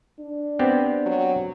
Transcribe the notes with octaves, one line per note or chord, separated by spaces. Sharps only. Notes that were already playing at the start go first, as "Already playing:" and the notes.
D4
B3 C4 G4
F#3